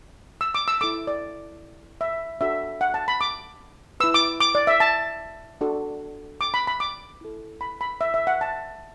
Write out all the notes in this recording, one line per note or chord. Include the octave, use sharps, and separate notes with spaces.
E6
D6
E6
E4 A4 D6
D5
E5
D4 F#4 A4 E5
F#5
A5
B5
D6
E4 B4 E6
D6
D6
D5
E5
A5
D4 F#4 A4
D6
B5
B5
D6
E4 A4
B5
B5
E5
E5
F#5
A5